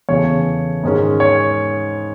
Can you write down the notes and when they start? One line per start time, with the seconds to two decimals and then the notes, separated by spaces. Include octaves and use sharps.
0.09 E2 C#3 E3 A3 C#5
0.83 G#2 D#3 G#3 C#4
1.20 C#5